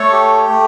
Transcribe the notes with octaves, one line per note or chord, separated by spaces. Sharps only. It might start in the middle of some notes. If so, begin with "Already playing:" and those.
Already playing: A3 A4 C#5
G4
A3